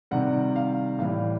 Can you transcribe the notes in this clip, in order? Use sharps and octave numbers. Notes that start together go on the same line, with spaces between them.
C3 D#3 G3 F#5
F5
A2 E3 G3 F5